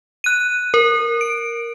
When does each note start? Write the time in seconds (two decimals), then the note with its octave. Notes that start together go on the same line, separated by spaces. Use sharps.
0.24 F#6 D#7
0.74 A#4
1.21 D7